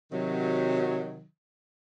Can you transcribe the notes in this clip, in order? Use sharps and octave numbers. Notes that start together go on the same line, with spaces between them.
C3 D#3 F#3